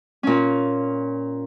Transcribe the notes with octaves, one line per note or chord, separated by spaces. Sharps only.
A#2 C#4